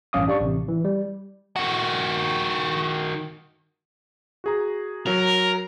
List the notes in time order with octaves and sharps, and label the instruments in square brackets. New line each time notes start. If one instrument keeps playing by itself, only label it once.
[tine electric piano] A1 G2 C#4 F5 D6 D#6
D4 G4 D5 C#6
A1 C3
E3
G3
[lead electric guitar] D#3 F#4
[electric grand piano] F#4 G#4 A#5
[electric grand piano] F#3 [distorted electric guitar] A#4